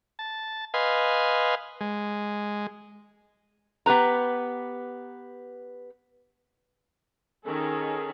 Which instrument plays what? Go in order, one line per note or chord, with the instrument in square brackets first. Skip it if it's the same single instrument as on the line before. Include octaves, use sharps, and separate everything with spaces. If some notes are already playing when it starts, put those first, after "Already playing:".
[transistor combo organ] A5
B4 D#5 F5 G#5 C6
G#3
[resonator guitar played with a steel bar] B3 G4 B4 A#5
[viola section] D#3 C#4 A4 [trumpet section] G#4